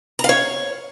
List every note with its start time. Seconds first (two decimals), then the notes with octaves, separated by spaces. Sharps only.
0.19 A#5
0.24 F5
0.29 C#5